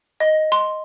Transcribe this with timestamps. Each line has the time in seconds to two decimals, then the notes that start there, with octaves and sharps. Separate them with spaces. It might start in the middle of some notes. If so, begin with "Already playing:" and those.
0.20 D#5
0.52 C6